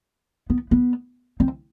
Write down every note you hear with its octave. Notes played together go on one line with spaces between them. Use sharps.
B3
B3
C4